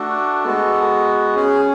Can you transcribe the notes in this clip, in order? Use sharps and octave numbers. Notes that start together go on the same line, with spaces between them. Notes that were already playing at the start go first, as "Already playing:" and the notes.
Already playing: A3 D4 F#4 A4
G#3 B3 F#4
C#4 G#4